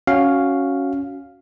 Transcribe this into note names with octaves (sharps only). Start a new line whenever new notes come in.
C#4 F#4 F5